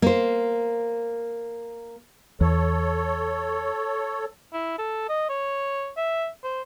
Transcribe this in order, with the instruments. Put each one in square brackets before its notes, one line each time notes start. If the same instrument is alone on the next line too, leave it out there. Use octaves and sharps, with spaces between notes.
[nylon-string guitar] A#3 C5
[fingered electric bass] E2 [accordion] A4 C#5
[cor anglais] E4
A4
D#5
C#5
E5
C5